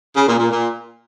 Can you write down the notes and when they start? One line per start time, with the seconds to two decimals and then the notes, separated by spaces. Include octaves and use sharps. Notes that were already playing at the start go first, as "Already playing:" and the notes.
0.16 C#3
0.27 A#2
0.39 A#2
0.50 A#2